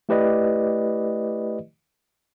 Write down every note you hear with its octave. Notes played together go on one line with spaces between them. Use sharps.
A3 E4 G4 B4 D5 D#5